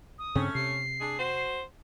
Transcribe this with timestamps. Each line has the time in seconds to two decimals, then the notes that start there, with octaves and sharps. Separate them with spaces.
0.19 D#6
0.35 G2 C#3 A3 C4 C#4
0.55 C3 C7
1.01 D4 G#4
1.18 F#4 C5